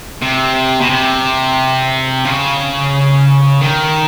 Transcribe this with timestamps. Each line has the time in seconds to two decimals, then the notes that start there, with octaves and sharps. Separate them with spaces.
0.22 C3
0.81 B2
0.90 C3
2.25 C#3
3.61 D#3